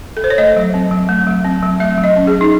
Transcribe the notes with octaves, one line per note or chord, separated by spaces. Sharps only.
A4
C5
C#5
A3 D#5
F#3
C4
F#3
A3
F#3
C4
F#3
A3 E5
F#3
D#5
C#4
G#4
F#3
D#4